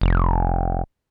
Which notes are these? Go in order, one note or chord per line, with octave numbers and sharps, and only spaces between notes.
F1